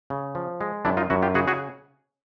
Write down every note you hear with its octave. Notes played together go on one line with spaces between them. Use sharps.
C#3
F3
G#3
F#2 D4 E4
D#4 F4
F#2 E4 F#4
F4 G4
C#3 F#4 G#4
F#4 G#4